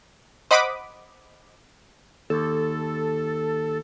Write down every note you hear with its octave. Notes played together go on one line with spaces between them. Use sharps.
C5 D#5 F#5 B5 D6 D#6
D#2 A4